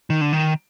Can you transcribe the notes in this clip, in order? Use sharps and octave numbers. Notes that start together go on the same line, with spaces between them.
D#3
D3
D#3